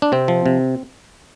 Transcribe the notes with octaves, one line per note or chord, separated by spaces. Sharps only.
D4
C3 C4
F3
C3